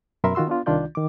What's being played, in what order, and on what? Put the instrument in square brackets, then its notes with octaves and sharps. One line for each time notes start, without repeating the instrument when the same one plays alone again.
[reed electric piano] F#2 B2 A#4 E5 B5 C6
D#3 F4 F#4 C6 E6
B3 D4 F4
C2 D#3 D4 F4 D5 G6
D#3 D6